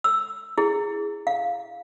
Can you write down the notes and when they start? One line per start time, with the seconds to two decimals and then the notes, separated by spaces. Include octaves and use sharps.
0.04 E6
0.58 E4 G#4
1.27 F5